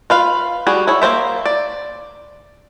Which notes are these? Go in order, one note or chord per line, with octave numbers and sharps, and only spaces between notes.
F4 B4 F5
G3 F#4 G#4
E4 G#4 C#5
A#3 C4 C5 E5
D5